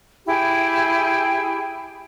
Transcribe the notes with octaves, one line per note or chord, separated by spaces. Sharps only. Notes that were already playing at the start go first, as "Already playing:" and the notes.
E4 G4 G#4 G5